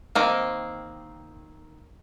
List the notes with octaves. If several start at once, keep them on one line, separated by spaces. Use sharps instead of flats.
D#3 A#3 C4